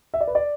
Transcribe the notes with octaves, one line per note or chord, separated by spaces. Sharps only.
E5
D5
B4
D5